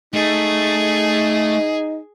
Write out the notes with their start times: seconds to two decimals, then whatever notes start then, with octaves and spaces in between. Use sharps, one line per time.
0.14 A3 D#4 G#4